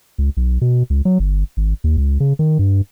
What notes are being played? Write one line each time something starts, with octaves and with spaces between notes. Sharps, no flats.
C#2
B1
B2
C#2
F#3
G1
G#1
D#2
C#2
C#3
D#3
G2